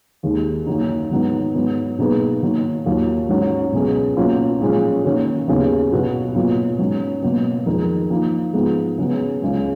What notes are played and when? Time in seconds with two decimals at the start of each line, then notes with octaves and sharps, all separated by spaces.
0.23 D#2 D#3 G#3
0.66 F#2 D#3 F#3 A#3 D#4
1.11 G#2 D#3 F#3 B3 D#4
1.55 G#2 F#3 B3
1.98 B2 A#3 D#4 G#4 B4
2.42 D#3 F#3 A#3
2.86 D#2 D#3 F#3 A#3 F4
3.29 G#2 F#3 C#4
3.72 C#2 B2 G#3 C#4 G#4
4.17 B2 F#3 A#3 C#4 F4
4.61 A#2 F3 G#3 C#4 F4
5.04 D#3 A#3 C#4 F#4 C#5
5.48 D#2 C#3 F#3 B3
5.92 B2 F#3 B3 F#4 B4
6.35 B2 F#3 A#3 F4
6.78 G#2 F#3 C#4
7.22 B2 F#3 A#3
7.66 F2 D#3 G#3 D#4 A#4
8.10 F3 A#3 D#4
8.53 G#2 F3 B3 D#4 G#4
8.98 C#3 F#3 B3
9.41 C#2 C#3 G#3